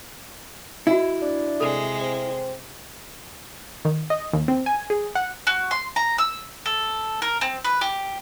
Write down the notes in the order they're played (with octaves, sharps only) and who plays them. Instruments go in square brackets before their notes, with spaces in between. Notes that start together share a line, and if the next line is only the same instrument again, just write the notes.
[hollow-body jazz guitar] E4 [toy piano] F#4 D#5
[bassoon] D4
[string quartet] C3 G#3 [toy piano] A4
[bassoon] C4
[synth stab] D#3
D#5
D#2
C4
G#5
G#4
F#5
[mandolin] F#4
C6
A#5
E6
A4
A#4
C4
B4
G4